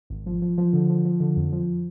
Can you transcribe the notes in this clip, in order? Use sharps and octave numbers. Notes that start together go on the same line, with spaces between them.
G#1
F3
F3
F3
D3
F3
F3
D3
F2
F3